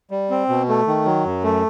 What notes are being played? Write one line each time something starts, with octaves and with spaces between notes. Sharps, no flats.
G3
C4
B2
A3
D#3
F#3
F#2
A3